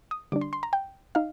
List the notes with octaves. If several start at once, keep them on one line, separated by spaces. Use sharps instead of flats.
D#6
D3 G3 D4 D6
C6
C6
A#5
G5
D#4 F5